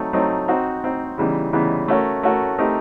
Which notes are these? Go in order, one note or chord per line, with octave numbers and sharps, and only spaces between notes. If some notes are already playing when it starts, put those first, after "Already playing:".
Already playing: F#3 A3 C4 D#4
F#3 A3 C4 D#4
C4 D#4 F#4
C4 D#4 F#4
C#3 E3 G3 B3 D#4
C#3 E3 G3 B3 D#4
A3 C#4 F#4 A#4
A3 C#4 F#4 A#4
A3 C4 D#4 G4 A#4